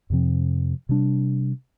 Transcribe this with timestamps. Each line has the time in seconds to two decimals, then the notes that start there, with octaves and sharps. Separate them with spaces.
0.10 F2 C3 F3 C4
0.89 C3 G3 D4